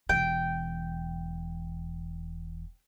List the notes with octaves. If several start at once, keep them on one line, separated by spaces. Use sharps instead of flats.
E1 E3 G5